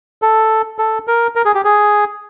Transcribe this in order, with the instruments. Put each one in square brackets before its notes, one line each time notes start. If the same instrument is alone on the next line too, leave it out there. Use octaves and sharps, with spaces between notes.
[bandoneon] A4
A4
A#4
A#4
G#4
G4
G#4